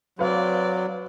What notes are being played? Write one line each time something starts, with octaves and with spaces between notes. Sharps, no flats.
F#3 C4 B4 D5 F5